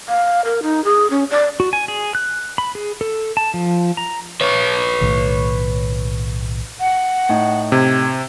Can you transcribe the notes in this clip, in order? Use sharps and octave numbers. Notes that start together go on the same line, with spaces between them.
F5
A#4
D#4
G#4
C#4
D5
F#4
G#5
G#4
F#6
B5
G#4
A4
A5
F3
A#5
B4 C#5
B1 A2 D#3
F#5
A2 D#4
C3 G#6